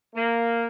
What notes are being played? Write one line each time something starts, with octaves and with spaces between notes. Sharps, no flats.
A#3